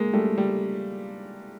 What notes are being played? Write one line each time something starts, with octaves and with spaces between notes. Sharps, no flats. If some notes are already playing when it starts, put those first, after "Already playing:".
Already playing: G#3 A#3
G3 A3
G3